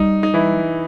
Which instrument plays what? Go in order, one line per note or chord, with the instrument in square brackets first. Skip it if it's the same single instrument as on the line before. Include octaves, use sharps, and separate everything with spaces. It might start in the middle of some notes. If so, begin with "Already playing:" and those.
Already playing: [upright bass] G3 [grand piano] D#4
[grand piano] D#4
E3 E4